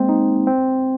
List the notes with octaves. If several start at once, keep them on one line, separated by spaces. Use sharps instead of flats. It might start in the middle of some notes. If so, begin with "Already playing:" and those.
Already playing: G#3 A#3 C4
D#4
C4